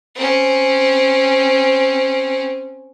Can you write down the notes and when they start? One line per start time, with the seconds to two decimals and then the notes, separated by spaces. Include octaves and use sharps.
0.15 C4 C#4